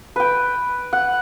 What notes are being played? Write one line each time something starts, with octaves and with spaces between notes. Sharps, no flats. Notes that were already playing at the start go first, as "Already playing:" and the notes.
B4 G5
F#5